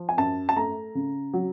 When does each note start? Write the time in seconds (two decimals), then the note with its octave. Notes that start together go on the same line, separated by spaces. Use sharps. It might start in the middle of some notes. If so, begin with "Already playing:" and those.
Already playing: F3
0.09 G#5
0.17 F#2 A5
0.49 A5
0.56 A3 A#5
0.95 C#3
1.34 F#3